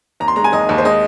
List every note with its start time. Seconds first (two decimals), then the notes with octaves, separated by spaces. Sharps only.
0.20 D#2 A#5
0.28 C6
0.36 G#3 A#5
0.44 G#5
0.52 D#2 D#5
0.69 D#2
0.78 C5
0.85 G#3 D#5